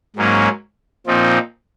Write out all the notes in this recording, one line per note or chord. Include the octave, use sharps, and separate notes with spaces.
G#2 F#3 A#3 C#4
A#2 F3 C4 D#4